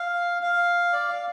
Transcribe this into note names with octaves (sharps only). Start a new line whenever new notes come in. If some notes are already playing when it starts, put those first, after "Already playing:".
Already playing: F5
F5
D5
F5